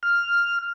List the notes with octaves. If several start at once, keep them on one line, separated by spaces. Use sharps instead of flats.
F6